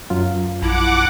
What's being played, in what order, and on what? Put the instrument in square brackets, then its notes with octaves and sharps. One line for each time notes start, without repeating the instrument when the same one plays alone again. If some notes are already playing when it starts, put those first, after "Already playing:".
[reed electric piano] F#2 F#3 F4
[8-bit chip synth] A#1 [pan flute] E4 [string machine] F#5 D6